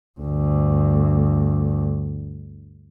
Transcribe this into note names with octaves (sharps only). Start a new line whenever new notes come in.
D2 G2